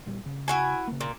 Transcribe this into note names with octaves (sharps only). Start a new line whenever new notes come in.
C2 A#2 G3
C#3
E4 F#4 G#5
C#3 A#3
A#2